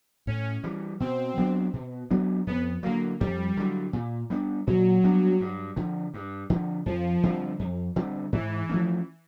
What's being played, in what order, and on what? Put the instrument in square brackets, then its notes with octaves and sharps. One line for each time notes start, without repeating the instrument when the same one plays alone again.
[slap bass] A2 [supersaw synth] C#4
[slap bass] E3 G3
[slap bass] B2 [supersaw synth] C4
[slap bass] F#3 B3 D4
B2
F#3 B3 D4
[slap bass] F2 [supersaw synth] B3
[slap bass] D3 F#3 [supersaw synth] A#3
[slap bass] F2 [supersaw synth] G3
[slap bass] D3 F#3
A#2
G3 B3 D4
[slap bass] A#2 [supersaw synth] F#3
[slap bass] G3 B3 D4
G2
D3 F3
G2
D3 F3
[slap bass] F2 [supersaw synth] F3
[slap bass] D3 G3 C4
F2
D3 G3 C4
[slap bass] G#2 [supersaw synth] E3
[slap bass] F3 A3 C#4